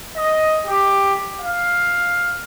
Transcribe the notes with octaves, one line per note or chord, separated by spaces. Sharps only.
D#5
G4
F5